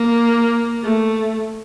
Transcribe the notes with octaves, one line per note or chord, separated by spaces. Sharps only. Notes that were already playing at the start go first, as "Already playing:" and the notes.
Already playing: A#3
A3